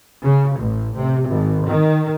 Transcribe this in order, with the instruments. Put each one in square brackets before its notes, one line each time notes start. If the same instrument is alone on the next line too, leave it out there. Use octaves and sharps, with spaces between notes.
[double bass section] C#3
A1
C3
G#1
D#3